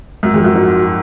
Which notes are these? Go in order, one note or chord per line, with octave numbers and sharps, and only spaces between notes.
F#2 F#4
F2 G#4
F#2 F#4
G#2 F#4